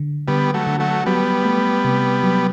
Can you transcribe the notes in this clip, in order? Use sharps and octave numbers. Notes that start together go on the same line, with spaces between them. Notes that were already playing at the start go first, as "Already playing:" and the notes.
Already playing: D3
D3 G3 B3
F#3 A3
D3
F#3 A3
F#3 G3 B3
A3
C3
F#3